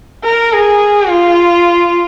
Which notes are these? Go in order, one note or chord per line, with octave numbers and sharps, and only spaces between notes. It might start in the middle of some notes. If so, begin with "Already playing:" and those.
A#4
G#4
F4